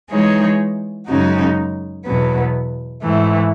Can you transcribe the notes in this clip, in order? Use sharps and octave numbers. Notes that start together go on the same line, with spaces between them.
E3 G#3 D#4 G#4 C#5
F#2 C#3 G#3 D#4 F#4
E2 B2 F#3 B3
G#2 E3 A3